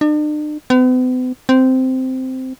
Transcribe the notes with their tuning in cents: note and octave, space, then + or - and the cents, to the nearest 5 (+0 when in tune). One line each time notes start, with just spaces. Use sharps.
D4 +45
B3 +45
C4 -10